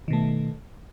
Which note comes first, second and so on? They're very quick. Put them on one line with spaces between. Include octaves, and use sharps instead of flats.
D#3 B2 A3